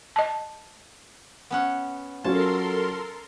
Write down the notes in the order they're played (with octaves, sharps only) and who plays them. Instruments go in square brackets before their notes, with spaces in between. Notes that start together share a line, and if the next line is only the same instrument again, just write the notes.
[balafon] D#5 A5
[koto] B3 C#4 F#5
[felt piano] F#3 C#4 F4 [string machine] A4 A#4 C6 [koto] A5